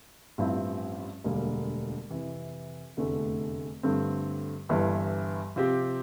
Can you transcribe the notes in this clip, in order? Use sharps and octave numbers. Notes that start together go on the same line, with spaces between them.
A1 G2 F3 C4 E4
E1 D2 D3 G3 A#3
F2 C3 E3
F1 E2 D3 A3
G2 D3 A3 C4
G1 G2 E3
C3 F3 C4 G4